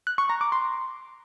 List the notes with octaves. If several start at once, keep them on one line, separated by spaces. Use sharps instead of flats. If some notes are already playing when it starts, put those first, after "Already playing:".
F#6
C#6
A#5
D6
C6